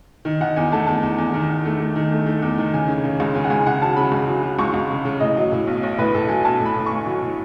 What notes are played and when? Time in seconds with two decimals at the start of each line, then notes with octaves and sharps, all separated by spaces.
0.25 D#3
0.41 D#3 F#5
0.56 E2 G#5
0.72 A3 A5
0.87 E2 A5
1.03 E2
1.18 E2
1.34 D#3
1.50 E2
1.65 A3
1.80 A3
1.96 D#3
2.12 A3
2.26 A3
2.42 E2
2.58 D#3
2.73 C#3 G#5
2.88 C#4
3.04 C#3
3.20 C#2
3.34 C#3 G#5
3.44 F#5
3.50 C#2 G#5
3.66 C#3 F#5
3.82 F#3 A5
3.96 C#3 B5
4.12 C#2
4.27 F#3
4.43 F#3
4.59 C#2 C#6
4.74 C#2
4.90 C#3
5.05 C#3
5.20 A2 D#5
5.37 F#3
5.52 A2
5.67 B1
5.83 B1
5.98 A2 B4
6.14 A2 A4
6.29 F#3 G#5
6.45 B1 A5
6.60 A2
6.65 B5
6.76 A2
6.86 A2 C#6
7.07 F#3
7.22 A2